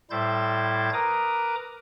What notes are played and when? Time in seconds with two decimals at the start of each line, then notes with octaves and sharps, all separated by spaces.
0.10 A2 G3 E4 C5 G6 A6
0.93 A#4 B4 A#5 D6 D#6